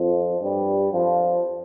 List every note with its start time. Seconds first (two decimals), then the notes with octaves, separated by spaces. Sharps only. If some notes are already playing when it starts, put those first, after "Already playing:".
Already playing: F2 F3
0.41 G2 G3
0.92 F2 F3